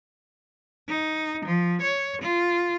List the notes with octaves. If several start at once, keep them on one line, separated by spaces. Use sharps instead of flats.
D#4
F3
C#5
F4